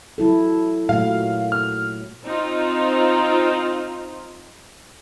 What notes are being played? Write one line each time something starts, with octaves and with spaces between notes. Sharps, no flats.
F#3 E4 A4
A#2 F#3 A3 F5
F6
C4 D#4 F4